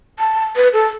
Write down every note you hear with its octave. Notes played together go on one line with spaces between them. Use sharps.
A5
B4
A4